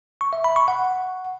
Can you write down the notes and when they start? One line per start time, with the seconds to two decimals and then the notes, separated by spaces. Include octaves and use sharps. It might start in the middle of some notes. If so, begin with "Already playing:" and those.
0.21 C#6
0.33 E5
0.44 B5
0.56 C#6
0.68 F#5